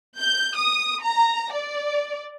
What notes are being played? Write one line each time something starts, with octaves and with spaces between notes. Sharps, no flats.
G6
D#6
A#5
D5